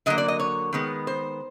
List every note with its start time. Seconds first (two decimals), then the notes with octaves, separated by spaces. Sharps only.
0.06 D3 F#3 A#3 D#5
0.18 D5
0.28 D#5
0.39 C#5
0.73 D#3 G#3 B3
1.07 C5